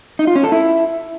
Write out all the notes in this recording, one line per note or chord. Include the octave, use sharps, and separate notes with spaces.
D#4
F4
C#4
A4
E4